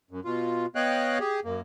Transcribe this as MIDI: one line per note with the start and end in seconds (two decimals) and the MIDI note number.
0.11 0.20 42
0.25 0.66 47
0.25 0.66 65
0.75 1.18 59
0.75 1.18 73
0.75 1.18 75
0.75 1.18 77
0.75 1.18 79
0.75 1.18 90
1.20 1.40 67
1.20 1.40 68
1.45 1.61 42
1.45 1.61 58